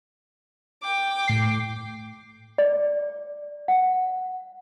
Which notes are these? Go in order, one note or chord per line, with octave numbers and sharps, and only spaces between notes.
G5 D6
A2 C7
D5
F#5